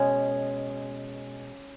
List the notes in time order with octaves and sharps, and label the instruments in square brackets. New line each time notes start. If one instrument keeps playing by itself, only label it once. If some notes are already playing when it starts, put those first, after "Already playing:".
Already playing: [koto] B2 G#3 C#4